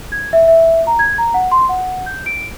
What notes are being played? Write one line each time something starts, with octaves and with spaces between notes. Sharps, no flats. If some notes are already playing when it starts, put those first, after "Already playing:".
G#6
E5
E5
A#5
G#6
A#5
F#5
C6
F#5
G6
D7